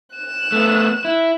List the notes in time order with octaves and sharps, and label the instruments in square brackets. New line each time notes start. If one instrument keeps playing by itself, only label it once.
[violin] F#6 E7
[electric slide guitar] A3 B3
E4